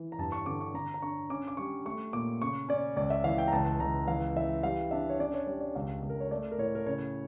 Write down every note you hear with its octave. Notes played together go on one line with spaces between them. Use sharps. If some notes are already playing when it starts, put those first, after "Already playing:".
Already playing: E3
A#5
G2 A5
C#6
D3 D6
C#6
D3 A#5
A#5
D4 C#6
C#4 D6
D6
G3 C#6
A3 C#6
A#2 D6
C#3 C#6
C#4 D5
C#2 D5
E5
E3 F5
G5
A#5
C#2 A5
C#2 A#5
E3 F5
E3 E5
G3 F5
D4 E5
C#5
C#4 D5
C#5
G3 C#5
D5
C#2 F5
C#2
A#4
C#5
A3 D5
A#4
A2 C#5
A#4
C#3 C#5